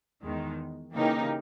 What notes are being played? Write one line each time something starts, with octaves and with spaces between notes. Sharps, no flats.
E2 D#3 G#3
C#3 E3 A#3 D#4 G4